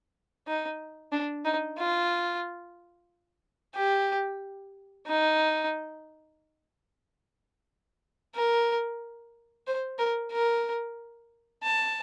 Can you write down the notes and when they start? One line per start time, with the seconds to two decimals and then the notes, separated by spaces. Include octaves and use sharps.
0.47 D#4
1.12 D4
1.45 D#4
1.78 F4
3.75 G4
5.07 D#4
8.35 A#4
9.67 C5
9.99 A#4
10.32 A#4
11.63 A5